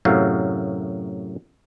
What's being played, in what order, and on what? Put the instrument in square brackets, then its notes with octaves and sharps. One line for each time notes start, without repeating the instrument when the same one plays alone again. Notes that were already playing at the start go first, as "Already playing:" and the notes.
[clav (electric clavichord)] F#2 A2 C3 F#3 F5